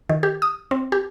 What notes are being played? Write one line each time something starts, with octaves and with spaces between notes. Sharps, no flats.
D#3
G4
D#6
C4
G4